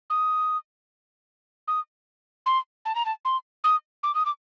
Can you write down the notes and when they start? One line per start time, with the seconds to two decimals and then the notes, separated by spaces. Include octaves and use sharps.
0.10 D#6
1.68 D#6
2.46 C6
2.85 A5
2.95 A#5
3.06 A5
3.25 C6
3.64 D#6
4.03 D6
4.15 D#6
4.26 D6